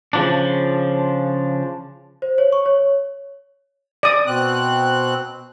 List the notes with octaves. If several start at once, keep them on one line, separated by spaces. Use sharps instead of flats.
C#3 F3 D4
C5
C#5
C#6
C#5
D5 D#6
B2 C4 F#6